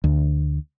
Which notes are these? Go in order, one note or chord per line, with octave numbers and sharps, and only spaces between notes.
D2